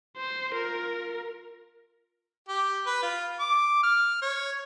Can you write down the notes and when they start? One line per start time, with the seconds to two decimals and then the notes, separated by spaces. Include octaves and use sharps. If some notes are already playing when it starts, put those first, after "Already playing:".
0.17 C5
0.52 F4 A#4
2.49 G4
2.86 B4
3.03 F4
3.40 D6
3.83 F6
4.22 C#5